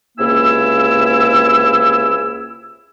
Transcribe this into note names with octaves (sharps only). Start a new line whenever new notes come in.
C#2 C3 A#3 E4 G#5 E6